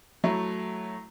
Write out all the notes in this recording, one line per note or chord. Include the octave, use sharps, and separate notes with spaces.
F#3 A3 E4